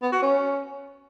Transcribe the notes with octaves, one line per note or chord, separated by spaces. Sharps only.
B3
F#4
C#4